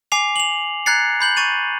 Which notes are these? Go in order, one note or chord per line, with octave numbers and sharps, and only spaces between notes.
G#5 D6 C7 F7
F7 F#7
A#5 F#6 G#6 A6 C7 C#7
B5 G6 F#7
C#6 A6 D#7 F7